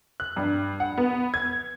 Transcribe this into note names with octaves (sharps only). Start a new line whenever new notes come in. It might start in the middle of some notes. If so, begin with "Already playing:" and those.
F#6
G2
F#5
B3
G#6